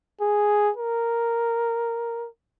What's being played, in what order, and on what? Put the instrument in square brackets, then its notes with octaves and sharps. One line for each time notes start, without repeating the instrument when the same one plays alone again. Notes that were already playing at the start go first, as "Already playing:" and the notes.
[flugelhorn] G#4
A#4